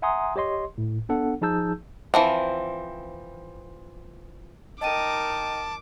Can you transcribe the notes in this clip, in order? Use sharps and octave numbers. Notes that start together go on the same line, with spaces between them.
E5 F#5 G#5 A#5 C6 D#6
G4 C#5 D#5 C6
A2
B3 D4 A4 F#5
F3 D#4 G#4 A5 E6 G6
E3 F3 C4
D#4 A#4 D#5 G5 A5 D6 D#7